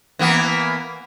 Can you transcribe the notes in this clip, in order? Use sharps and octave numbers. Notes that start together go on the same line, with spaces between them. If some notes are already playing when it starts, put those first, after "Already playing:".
E3 A#3 B3